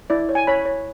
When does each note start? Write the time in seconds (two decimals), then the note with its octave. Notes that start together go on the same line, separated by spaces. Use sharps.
0.10 E4 D5
0.29 C#5
0.35 G#5
0.47 C#5 B5
0.65 C#5